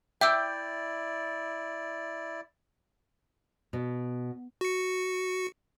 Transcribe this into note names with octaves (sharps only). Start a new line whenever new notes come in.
E4 D5 E5 G5 D6 E6
B2
F#4 C#7